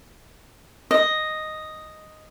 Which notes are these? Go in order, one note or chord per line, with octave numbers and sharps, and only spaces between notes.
D#5